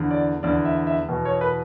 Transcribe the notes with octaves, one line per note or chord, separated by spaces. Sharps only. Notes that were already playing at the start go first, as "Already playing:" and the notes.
Already playing: E2 D3
D5
E2 D3 D5
E5
E5
E2 B2
C#5
B4